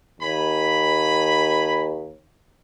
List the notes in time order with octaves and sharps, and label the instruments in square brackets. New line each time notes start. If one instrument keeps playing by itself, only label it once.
[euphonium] D#2 [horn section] G#5 B5